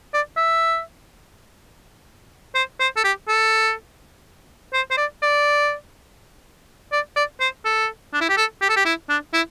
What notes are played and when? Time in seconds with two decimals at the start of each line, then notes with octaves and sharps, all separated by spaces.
0.14 D5
0.37 E5
2.55 C5
2.80 C5
2.97 A4
3.05 G4
3.28 A4
4.74 C5
4.91 C5
4.98 D5
5.22 D5
6.92 D5
7.16 D5
7.40 C5
7.65 A4
8.14 D4
8.21 E4
8.29 G4
8.37 A4
8.62 G4
8.69 A4
8.76 G4
8.85 E4
9.09 D4
9.34 E4